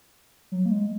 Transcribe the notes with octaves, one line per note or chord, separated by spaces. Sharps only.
F#3
A#3
G#3